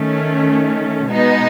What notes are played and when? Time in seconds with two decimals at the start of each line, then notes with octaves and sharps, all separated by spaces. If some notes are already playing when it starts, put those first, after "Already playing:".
Already playing: D#3 A3 C#4
1.11 B2 G#3 B3 D#4